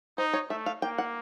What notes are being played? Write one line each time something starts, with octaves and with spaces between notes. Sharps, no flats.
D#4 C5
C#5
A3 E5
F5
A#3 G5
F#5